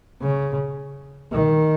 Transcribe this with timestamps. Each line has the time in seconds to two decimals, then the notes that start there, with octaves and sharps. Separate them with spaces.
0.21 C#3
1.33 D#3